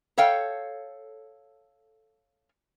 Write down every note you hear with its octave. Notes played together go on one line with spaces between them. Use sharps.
A4 C#5 F5 G5